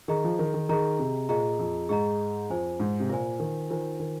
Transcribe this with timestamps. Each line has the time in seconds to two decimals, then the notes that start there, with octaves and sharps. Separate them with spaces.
0.08 D#3 G#4 D#5 A#5
0.24 F3
0.39 D#3
0.54 D#3
0.69 D#3 G#4 D#5 A#5
0.99 C3
1.29 A#2 G#4 D#5 A#5
1.59 F2
1.89 G#2 G#4 D#5 A#5
2.50 F2 F4 C5 G#5
2.80 G#2
3.00 C3
3.10 A#2 F4 C5 G#5
3.39 D#3
3.70 D#3 F4 C5 G#5
4.00 D#3